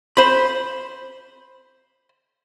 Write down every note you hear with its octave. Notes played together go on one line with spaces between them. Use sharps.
C5 B5